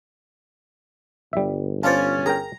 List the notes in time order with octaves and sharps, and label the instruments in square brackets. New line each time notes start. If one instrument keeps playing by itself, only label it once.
[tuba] G1 [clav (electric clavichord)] G3 E5
[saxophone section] C#4 [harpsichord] F4 D5 [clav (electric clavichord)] C5 A5
[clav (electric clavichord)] G#4 A#4 G5 [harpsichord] A#5